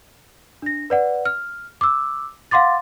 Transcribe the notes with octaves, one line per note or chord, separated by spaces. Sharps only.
D4 A#6
B4 D5 F#5
F6
D6 E6
F5 F#5 C6 D6 A6